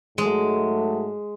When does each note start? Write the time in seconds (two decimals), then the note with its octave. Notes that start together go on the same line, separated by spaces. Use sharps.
0.18 G#2 F#3 G#3 A3